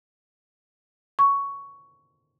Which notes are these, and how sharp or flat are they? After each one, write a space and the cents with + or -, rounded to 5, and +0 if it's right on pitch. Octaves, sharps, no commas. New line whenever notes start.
C#6 +10